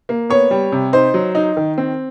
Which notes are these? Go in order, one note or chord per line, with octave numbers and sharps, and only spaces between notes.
A#3
B3 C#5
G3
C3
D#4 C5
F#3
D#4
D#3
C4